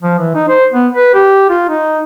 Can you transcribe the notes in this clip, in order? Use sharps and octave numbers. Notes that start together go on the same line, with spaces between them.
F3
E3
D#4
C5
B3
B4
G4
F4
D#4